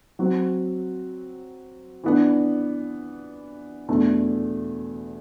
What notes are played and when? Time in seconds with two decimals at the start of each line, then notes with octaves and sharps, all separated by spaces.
0.19 F#3 C4 F#4
2.04 E3 B3 D4
3.89 E2 B2 A3 D4